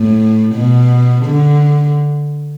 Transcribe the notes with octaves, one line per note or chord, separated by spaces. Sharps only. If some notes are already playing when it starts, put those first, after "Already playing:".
Already playing: A2
B2
D3